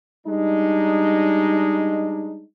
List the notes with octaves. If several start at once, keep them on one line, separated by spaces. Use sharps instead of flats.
G3 G#3 D4 D#4